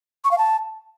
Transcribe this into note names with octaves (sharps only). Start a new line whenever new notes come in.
C#6
F5
A5